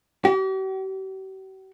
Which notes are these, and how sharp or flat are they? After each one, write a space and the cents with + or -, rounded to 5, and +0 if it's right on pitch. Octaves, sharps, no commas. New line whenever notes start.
G4 -45